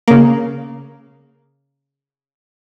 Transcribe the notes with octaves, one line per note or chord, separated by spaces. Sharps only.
C#3 A#3